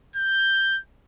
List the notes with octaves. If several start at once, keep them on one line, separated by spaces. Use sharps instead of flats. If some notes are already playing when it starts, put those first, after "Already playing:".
G6